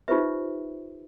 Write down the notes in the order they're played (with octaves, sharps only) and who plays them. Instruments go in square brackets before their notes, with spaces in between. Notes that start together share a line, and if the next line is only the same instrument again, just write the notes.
[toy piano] D#4 F4 G4 B4 C5 E5